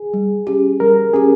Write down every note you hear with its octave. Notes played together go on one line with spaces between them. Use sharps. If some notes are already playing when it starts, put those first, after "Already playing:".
Already playing: G#4
G3
C#4 G4
G3 A#4
C#4 G4 G#4